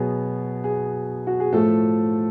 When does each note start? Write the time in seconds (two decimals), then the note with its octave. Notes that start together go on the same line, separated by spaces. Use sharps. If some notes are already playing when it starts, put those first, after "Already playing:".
Already playing: B2 F#3 B3 G#4
0.64 G#4
1.27 F#4
1.40 G#4
1.53 A2 F3 A3 A4